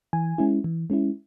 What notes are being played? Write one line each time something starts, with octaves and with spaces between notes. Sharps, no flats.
E3 G#5
G#3 C#4 E4
E3
G#3 C#4 E4